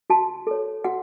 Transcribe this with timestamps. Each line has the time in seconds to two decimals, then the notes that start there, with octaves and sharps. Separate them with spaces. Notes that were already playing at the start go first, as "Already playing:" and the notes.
0.10 F#4 A5
0.47 A4 C#5
0.84 F#4 F#5